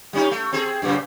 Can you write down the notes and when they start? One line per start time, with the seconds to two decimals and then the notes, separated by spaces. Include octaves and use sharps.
0.13 G3 C#4 D#4
0.31 A3
0.53 C4 G#4 A4
0.82 F#2 A#2 C#3